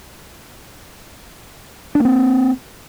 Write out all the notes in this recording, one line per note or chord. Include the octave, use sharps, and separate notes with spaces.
A#3 C4 D4